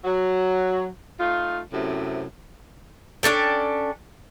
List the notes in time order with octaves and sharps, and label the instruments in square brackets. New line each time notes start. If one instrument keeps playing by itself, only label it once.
[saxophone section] F#3
A3 D#4 F4
F#2 A2 C3
[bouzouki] C#4 D4 A4 G5